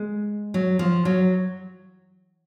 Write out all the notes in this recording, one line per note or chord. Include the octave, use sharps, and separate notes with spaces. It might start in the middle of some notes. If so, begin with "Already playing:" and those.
Already playing: G#3
F#3
F3
F#3